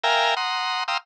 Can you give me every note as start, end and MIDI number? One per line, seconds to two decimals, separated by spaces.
0.04 0.35 70
0.04 0.35 76
0.04 0.35 77
0.04 0.35 79
0.04 0.35 80
0.04 0.35 82
0.37 0.84 78
0.37 0.84 82
0.37 0.84 84
0.37 0.84 87
0.88 0.97 77
0.88 0.97 79
0.88 0.97 82
0.88 0.97 84
0.88 0.97 87
0.88 0.97 88